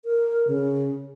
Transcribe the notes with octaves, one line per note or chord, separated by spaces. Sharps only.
A#4
C#3